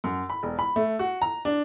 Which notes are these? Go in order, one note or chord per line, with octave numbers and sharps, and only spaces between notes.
F#2
B5
E1
B5
A3
F#4
A#5
D4